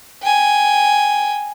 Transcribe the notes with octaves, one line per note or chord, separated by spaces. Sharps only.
G5 G#5